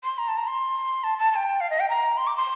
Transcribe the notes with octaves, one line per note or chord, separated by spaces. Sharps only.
C6
A#5
A5
A#5
C6
A5
A5
A5
G5
F5
D#5
G5
A#5
C6
D6
C6